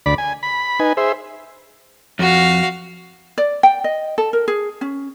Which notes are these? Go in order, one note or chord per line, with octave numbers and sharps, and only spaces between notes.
D2 D5 B5
G#5
B5
D#4 B4 G#5
G#4 C5 E5
F2 F#4 F5
D5
G5
D#5
A4
A#4
G#4
C#4